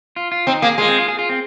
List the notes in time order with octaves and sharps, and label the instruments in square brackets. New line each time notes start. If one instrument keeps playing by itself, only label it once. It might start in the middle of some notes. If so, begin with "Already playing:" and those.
[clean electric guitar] F4
F4
[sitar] C4 [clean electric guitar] D#4
[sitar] A#3 [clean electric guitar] G#4
[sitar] G#3 [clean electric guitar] F4
[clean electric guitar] C4
F4
G#4
F4
C4